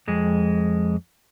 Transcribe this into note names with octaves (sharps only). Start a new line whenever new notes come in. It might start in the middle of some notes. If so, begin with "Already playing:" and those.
F2 G#3